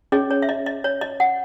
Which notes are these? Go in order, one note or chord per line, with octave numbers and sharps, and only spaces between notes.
C#4 G#4 C#5 D#5
C#5
E5
D#5
D#5
C#5
D#5
F#5